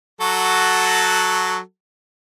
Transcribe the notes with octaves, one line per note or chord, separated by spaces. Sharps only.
F#3 F#4 A4